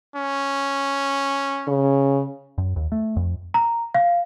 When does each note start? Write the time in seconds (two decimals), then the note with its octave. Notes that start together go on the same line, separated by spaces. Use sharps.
0.16 C#4
1.68 C#3
2.58 F#2
2.76 D#2
2.92 A3
3.16 F2
3.54 A#5
3.95 F5